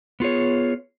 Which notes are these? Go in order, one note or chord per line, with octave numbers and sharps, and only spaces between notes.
B3 F4 G#4 C#5